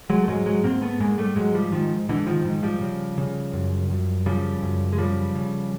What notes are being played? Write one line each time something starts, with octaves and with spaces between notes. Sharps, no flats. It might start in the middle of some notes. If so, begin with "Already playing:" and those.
F#3 G#3
A3
G#2 F#3 G#3
F#3 G#3
G#2 A#3 C4
A3 B3
G#2 G#3 A#3
G3 A3
G#2 F#3 G#3
F3 G3
G#2 D#3 F3
G#2 D3 E3
D#3 F3
G#2 D#3
F3 G3
C#3
C#3
F#2
F#2
C#3 F3 G3
F#2
G#3
C#3 F3 G3
C#3